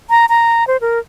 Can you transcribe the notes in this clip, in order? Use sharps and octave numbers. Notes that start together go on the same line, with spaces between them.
A#5
A#5
C5
A#4